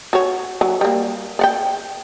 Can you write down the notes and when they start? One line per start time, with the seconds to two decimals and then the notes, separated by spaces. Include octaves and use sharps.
0.13 F#4 C#5
0.61 F#3
0.81 G3 A#3
1.39 D5 F#5 G5